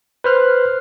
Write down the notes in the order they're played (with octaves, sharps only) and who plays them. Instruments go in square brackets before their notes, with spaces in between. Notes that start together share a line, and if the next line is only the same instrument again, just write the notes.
[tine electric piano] B4 C5 F6 F#6